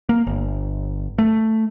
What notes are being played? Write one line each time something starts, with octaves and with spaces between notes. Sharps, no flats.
A#3
G1
A3